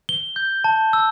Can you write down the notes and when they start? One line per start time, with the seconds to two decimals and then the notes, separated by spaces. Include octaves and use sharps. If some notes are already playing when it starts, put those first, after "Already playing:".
0.09 G7
0.36 G6
0.64 A5
0.93 E6